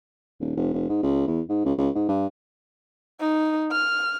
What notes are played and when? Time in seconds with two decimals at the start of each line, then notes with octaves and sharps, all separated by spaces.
0.40 D#1
0.56 F1
0.74 F1
0.89 G#2
1.03 C#2
1.27 E2
1.49 G#2
1.65 C#2
1.78 C#2
1.95 G#2
2.09 G2
3.20 D#4
3.72 F6